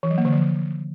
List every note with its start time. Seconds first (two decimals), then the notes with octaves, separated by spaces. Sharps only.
0.03 E3
0.10 F#3
0.18 A#3
0.25 D3
0.32 F3